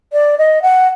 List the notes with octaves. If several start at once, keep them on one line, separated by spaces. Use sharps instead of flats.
D5
D#5
F#5